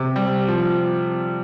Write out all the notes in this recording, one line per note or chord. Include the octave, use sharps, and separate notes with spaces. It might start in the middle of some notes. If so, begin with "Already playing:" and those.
Already playing: C3
G3
F3